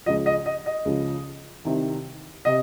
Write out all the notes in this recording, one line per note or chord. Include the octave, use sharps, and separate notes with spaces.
C#2 C#3 F3 D#5
D#5
D#5
D#5
C#2 C#3 F3
C2 C3 D#3
C3 D#5